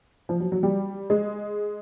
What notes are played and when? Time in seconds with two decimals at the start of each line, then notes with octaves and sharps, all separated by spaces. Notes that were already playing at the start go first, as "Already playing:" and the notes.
0.29 F3
0.40 F#3
0.52 F#3
0.63 G3
1.10 G#3